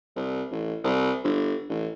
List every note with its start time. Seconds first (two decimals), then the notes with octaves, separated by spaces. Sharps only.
0.16 C2
0.51 A1
0.84 C2
1.24 G1
1.69 A1